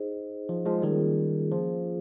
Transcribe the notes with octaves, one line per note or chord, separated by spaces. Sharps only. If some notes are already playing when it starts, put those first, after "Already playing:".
Already playing: D#4 G#4 C5 D#5
F3
F3 G#3
D#3 G3 A#3 C#4 F4 G#4
F3